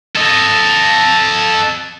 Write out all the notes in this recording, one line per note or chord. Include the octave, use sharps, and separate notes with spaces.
A4 D#5